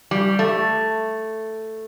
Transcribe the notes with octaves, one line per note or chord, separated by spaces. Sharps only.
G3
A3